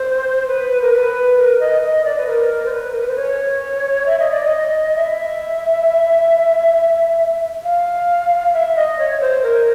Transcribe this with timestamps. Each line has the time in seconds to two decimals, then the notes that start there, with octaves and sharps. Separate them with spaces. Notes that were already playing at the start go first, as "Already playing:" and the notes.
Already playing: C5
0.48 B4
0.82 A#4
0.93 B4
1.37 A#4
1.60 D#5
1.82 D#5
2.04 D5
2.18 B4
2.27 A#4
2.66 C5
2.72 B4
2.91 A#4
3.00 B4
3.08 C5
3.16 C#5
4.06 E5
4.19 D#5
4.31 D5
4.44 D#5
4.95 E5
7.64 F5
8.54 E5
8.76 D#5
8.98 C#5
9.21 C5
9.43 A#4